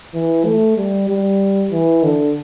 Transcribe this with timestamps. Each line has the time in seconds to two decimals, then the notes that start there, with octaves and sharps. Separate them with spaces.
0.14 E3
0.45 A3
0.77 G3
1.09 G3
1.72 E3
2.03 D3